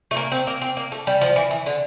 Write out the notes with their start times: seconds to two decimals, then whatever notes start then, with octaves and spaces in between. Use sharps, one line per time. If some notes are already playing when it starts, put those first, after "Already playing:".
0.11 A3
0.16 A#3
0.32 C4
0.47 A#3
0.61 C4
0.77 A#3
0.92 A3
1.07 G3
1.21 F3
1.36 E3
1.51 E3
1.66 D3